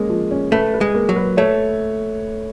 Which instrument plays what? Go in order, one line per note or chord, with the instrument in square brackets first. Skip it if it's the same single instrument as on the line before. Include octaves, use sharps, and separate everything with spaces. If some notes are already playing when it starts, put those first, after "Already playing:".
Already playing: [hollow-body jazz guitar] G#3 [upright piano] A#3 C#4
[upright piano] F3
C#4
[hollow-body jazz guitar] A3 [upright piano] B4
[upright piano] B4
[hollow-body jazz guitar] G#3
[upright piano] A#3
[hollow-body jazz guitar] F#3
[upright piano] B4
[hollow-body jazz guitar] A3 [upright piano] C#5